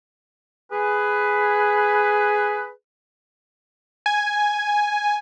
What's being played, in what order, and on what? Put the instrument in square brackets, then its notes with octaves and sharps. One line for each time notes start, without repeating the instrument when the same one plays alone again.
[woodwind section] G#4 B4
[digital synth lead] G#5